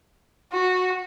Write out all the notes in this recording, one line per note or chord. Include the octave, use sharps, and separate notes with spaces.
F#4